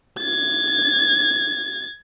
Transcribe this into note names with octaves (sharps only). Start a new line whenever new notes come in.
G#6 A6